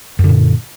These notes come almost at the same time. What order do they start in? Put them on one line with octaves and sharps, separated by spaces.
F#2 D3 A#2